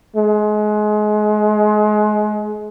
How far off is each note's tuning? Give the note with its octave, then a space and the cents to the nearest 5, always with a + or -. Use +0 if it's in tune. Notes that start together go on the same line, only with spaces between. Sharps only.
G#3 +30